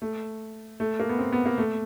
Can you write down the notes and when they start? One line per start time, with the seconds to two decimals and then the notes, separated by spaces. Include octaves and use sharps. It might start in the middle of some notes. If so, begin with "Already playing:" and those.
0.02 A3
0.80 A3
1.00 A#3
1.09 B3
1.19 C4
1.33 B3
1.46 A#3
1.58 A3